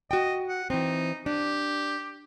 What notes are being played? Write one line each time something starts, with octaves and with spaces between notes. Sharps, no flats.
F#4 D#5 G5
F#5
E3 C4 D#4
D4 G4